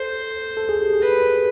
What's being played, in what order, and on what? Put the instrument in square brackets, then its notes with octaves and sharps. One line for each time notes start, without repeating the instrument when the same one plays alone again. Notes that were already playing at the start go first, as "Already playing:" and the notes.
Already playing: [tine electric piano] A4 [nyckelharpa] C5
[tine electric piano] A4
G#4
G4
G#4
[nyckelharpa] B4